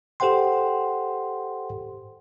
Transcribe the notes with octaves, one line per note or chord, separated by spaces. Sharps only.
G4 A4 C5 F#5 G5 C6